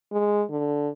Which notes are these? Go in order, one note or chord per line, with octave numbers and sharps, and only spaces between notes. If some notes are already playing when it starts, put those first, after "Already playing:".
G#3
D3